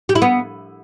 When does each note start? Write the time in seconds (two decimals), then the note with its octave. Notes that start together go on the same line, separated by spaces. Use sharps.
0.09 G4
0.15 E4
0.22 B3